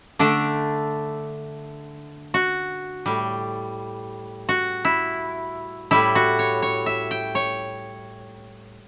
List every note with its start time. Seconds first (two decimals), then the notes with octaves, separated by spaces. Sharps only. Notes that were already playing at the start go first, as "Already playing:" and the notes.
0.19 D3 A3 D4
2.34 F#4
3.06 A2 G3
4.49 F#4
4.85 E4
5.91 A2 G3 E4
6.15 F#4
6.39 C#5
6.62 C#5
6.86 E5
7.11 G5
7.35 C#5